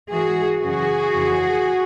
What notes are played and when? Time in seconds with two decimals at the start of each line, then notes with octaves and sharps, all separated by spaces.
0.10 G#2 E3 F#4 G#4
0.61 F#2 C#3 E3 F#4 G#4
1.13 F2 C#3 E3